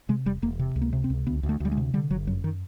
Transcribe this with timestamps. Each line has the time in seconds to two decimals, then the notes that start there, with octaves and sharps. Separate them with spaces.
0.09 C3 G#3
0.26 E1 G3
0.42 E1 A#3
0.59 C3
0.76 C#2
0.82 A#3
0.93 C3
1.04 C4
1.10 C#2
1.26 D2 B3
1.43 D2
1.49 A3
1.60 D2 G3
1.72 G#3
1.77 C3
1.94 D3 G3
2.10 G1 F#3
2.27 F#2 F#3
2.44 D#3